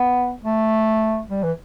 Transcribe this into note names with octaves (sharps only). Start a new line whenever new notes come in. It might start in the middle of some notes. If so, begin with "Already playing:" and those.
Already playing: B3
A3
G3
E3